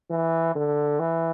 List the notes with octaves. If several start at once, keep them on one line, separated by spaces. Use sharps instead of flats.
E3
D3
E3